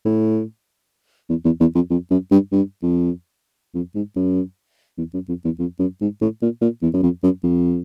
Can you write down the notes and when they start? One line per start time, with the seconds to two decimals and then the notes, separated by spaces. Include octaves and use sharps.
0.06 A2
1.30 E2
1.45 E2
1.60 E2
1.75 F2
1.91 F2
2.11 F#2
2.31 G2
2.52 G2
2.82 F2
3.75 F2
3.95 G#2
4.16 F#2
4.98 E2
5.14 F#2
5.29 F2
5.45 E2
5.59 F2
5.79 F#2
6.01 G#2
6.21 A2
6.42 A#2
6.62 A#2
6.82 E2
6.94 F#2
7.03 F2
7.23 F#2
7.43 F2